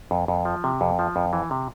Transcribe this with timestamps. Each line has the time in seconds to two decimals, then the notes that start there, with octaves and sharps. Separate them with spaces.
0.11 F2
0.28 F2
0.45 F3
0.64 C3
0.81 F2
0.99 F3
1.16 F2
1.33 E3
1.51 C3